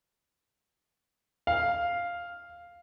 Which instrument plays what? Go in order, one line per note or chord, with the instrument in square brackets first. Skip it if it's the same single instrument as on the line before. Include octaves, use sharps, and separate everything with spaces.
[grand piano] F5